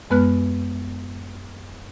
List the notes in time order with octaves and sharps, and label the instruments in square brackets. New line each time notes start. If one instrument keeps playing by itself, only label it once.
[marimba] F#2 G#3 B3 B4 F6 F#6